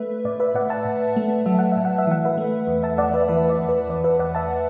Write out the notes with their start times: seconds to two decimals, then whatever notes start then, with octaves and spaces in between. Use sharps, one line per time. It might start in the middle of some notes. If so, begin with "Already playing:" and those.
Already playing: A3 B4 E5
0.25 A2 D5
0.40 B4 E5
0.54 A2 D5 F#5
0.70 E5 A5
0.85 A2
1.16 A3
1.46 F#3 E5
1.59 F#5
1.72 A2 E5
1.85 F#5
1.98 E5
2.07 E3 F#5
2.25 B4 E5
2.38 A3
2.67 E2
2.83 E5 A5
2.98 E2 D5 F#5
3.14 B4 E5
3.28 E3 B4 E5
3.49 D5
3.58 E2
3.69 B4
3.89 E2 D5
4.04 B4 E5
4.19 E2 D5 F#5
4.35 E5 A5